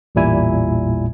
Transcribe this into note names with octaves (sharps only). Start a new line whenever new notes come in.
A1 E2 A#2 G3 E4 G#5